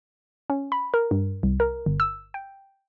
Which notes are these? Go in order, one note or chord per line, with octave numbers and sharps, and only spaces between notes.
C#4
B5
A#4
G2
C2
A#4
G1
E6
G5